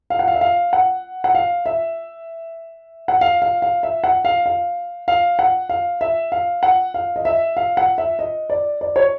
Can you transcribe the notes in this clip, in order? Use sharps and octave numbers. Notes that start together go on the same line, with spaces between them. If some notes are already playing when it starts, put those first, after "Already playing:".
F5
F#5
F5
E5
F5
F#5
F#5
F5
E5
F#5
F5
F5
F5
E5
F#5
F5
F5
F5
F#5
F5
E5
F5
F#5
F5
D#5
E5
F5
F#5
E5
D#5
D5
D5
C#5